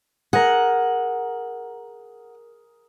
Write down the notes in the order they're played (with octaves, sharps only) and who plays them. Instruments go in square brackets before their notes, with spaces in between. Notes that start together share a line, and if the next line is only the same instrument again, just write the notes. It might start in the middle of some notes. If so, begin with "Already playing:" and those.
[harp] G#4 A#4 [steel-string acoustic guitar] F#5